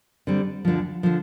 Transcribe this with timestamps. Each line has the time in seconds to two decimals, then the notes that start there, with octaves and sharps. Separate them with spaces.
0.27 D3 G3 C4
0.65 D2 D3 F3
1.03 D3 F3